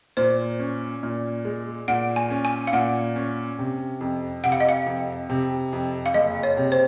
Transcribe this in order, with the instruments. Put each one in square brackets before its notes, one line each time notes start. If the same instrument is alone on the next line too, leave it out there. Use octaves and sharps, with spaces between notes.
[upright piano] A#2 [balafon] C5
[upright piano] C#4
A#2
G#3
[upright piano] A#2 [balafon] F#5
[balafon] G#5
[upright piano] C#4
[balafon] G#5
F5
[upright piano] A#2 [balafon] F#5
[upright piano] C#4
C3
F2
[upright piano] C3 [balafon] F#5
[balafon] F5
D#5
F5
[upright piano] F2
C3
F2
[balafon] F5
[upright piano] F#1 [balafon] D#5
[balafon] C#5
[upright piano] C3
[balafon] C5